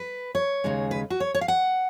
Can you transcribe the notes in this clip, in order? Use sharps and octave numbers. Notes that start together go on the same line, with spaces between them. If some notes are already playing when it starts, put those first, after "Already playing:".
Already playing: B4
C#5
D#2 C#3 G#3 D#4
B4
F#4
C#5
C#5
F5
F#5